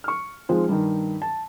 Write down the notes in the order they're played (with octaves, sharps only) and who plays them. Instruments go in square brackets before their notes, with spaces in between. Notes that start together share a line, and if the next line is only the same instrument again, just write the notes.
[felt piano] C#6 F6
F3 G#3 C4 D#4 F4
G2 D#3
A5